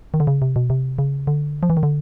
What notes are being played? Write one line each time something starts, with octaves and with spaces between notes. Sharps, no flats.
D#3
D3
C#3
C3
B2
C3
C#3
D3
F3
E3
D#3
D3